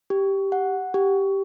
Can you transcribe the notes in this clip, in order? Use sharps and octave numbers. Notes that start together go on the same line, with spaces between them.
G4
F#5
G4